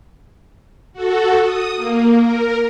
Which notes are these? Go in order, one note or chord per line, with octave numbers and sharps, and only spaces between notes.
F#4 A4
D#6
A#3
A#4